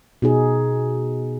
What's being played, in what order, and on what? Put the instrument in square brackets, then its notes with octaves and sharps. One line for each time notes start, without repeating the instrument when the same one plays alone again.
[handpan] B2 D#4 G#4